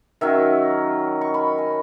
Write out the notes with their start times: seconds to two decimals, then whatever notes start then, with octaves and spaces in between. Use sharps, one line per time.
0.21 D#3 F#3 C#4 E5
1.21 C#6
1.34 B5
1.58 G#5